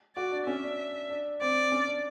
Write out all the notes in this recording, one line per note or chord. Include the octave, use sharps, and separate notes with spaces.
F#4 D5
D4
C#4 E5
D4
D4
C4 D5
C#4
D4